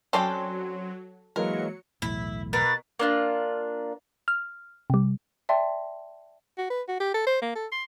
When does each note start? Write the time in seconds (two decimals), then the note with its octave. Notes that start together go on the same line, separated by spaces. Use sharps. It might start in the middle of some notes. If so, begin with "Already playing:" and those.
0.13 F#3 C4 C#4 A4 D5 G5 C6
1.36 E3 F#3 G#3 A#3 A#4 C#7
2.02 B1 E2 A2 E4
2.53 B2 A#4 B4 A6
2.99 A#3 D4 F4
4.28 F6
4.90 C3 G3
5.49 D5 E5 G5 A5 C6
6.58 F#4
6.70 B4
6.88 F#4
7.00 G4
7.14 A4
7.27 C5
7.42 A#3
7.55 A4
7.72 C6